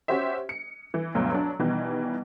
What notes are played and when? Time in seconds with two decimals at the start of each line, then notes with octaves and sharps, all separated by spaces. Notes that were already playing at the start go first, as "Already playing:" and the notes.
0.08 C#4 F#4 G4 C5 E5
0.49 C#7
0.94 E3
1.15 D2 G2 B2 F#3
1.32 F#3 D4
1.59 B2 D#3 E3 G3